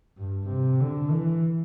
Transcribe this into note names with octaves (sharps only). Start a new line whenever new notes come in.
G2
C3
D3
E3